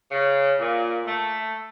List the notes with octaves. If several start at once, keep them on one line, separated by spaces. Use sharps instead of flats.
C#3
A#2
A3